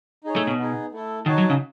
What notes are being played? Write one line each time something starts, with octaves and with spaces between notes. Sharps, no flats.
D#4 G#4 C#5
A3
B2
B3 D#4 G#4
A3 E4 A4
D#3 D#4 F#4 C#5 F#5 A5
F#3
C#3